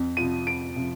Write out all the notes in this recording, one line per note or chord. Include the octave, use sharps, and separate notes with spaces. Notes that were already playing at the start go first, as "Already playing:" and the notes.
Already playing: F2
C3 F3 D#7
F2 D7
C3 F3